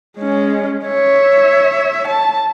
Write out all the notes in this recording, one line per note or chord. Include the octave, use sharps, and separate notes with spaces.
G#3 C#4
C#5 E5
A5